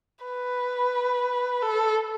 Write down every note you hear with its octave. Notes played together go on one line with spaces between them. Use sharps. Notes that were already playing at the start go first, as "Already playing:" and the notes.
B4
A4